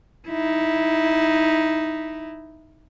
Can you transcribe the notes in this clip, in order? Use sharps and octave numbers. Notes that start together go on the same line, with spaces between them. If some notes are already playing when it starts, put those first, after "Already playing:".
D#4 E4